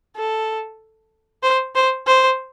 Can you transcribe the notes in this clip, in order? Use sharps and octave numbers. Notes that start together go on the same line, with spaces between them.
A4
C5
C5
C5